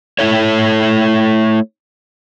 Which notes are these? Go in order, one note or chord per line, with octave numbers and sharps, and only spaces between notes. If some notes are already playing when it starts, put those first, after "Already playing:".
A3 E4 A4 C#5